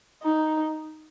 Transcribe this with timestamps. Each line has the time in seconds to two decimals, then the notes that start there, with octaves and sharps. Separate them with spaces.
0.23 D#4